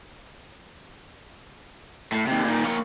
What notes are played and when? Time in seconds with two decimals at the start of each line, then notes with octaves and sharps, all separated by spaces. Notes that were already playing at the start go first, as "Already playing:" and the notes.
2.12 A2
2.27 D#2 C3
2.45 A#2 D#3
2.64 A#3 C#5